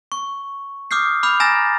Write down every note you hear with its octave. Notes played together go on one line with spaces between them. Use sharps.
C#6
D6 D#6 F6 G6 C7
B5 D6 F6 G6 F7
G#5 A#5 E6 A6 A#6